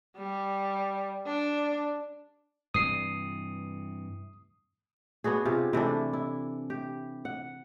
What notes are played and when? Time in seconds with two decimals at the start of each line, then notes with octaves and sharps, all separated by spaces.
0.16 G3
1.26 D4
2.74 G2 C3 E3 D#6 C7
5.24 B3 D4 F#4 G#4
5.45 C3 F4 G4 G#4
5.73 C3 E3 A3 D4
6.13 E4
6.70 G4
7.25 F#5